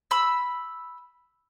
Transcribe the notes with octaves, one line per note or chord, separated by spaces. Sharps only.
B5 E6